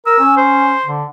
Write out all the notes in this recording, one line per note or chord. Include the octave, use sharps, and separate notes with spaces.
A#4 E6
C#4
C5
D3